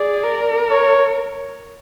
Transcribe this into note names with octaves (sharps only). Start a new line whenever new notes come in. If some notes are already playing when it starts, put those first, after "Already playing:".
Already playing: G#4 D5
A#4
C#5